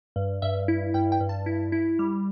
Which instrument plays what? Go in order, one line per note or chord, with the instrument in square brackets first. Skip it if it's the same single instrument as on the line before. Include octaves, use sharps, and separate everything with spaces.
[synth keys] G2
G2 E5
E4
G2 G5
G5
G2
A5
E4
E4
G3